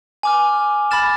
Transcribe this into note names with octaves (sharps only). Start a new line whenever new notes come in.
G#5 D6 F6
B5 F6 A6 E7